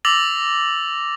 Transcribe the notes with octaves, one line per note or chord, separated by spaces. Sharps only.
D6 E6 A6 A#6 F7 F#7